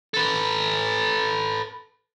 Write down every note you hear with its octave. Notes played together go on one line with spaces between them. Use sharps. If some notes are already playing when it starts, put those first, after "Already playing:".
A4 B4